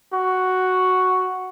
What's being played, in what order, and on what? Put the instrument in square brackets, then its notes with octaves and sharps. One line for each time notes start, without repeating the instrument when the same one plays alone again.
[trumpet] F#4